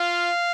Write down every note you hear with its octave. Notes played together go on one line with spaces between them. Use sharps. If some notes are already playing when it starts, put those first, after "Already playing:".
Already playing: F4 F5